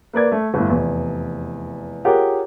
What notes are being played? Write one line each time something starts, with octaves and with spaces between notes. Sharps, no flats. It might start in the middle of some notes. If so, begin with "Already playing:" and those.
A#3 B4 D5 G#6
A3
G1 A2
F1 E2
F4 G4 G#4 A#4 C#5 F#5